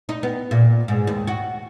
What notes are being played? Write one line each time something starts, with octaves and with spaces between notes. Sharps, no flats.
D#4
B3
A#2
G#2
D#2
F#4